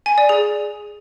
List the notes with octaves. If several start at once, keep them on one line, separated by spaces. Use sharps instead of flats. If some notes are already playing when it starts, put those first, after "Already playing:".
G#5
D5
G#4